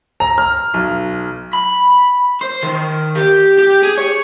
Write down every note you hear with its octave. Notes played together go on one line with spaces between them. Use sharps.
A#5
F6
B1
B5
C5
D#3
G4
G4
G#4
C#5